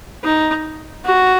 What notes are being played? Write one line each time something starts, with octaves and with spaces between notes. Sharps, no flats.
D#4
F#4